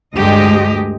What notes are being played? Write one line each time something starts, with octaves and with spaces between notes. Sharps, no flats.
D2 G2 G#3 G4 D#5